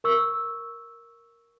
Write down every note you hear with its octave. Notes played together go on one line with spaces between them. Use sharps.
A#4 C#6 E6